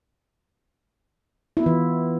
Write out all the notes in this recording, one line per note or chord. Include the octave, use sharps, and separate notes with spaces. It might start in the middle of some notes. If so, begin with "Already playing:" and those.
E3 B3 E4 F4